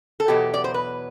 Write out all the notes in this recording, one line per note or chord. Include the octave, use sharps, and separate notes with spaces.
A4
E2 B2 F#3 G4
D5
C5
B4